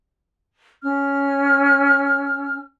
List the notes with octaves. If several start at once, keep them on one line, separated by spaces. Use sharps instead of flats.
C#4 F6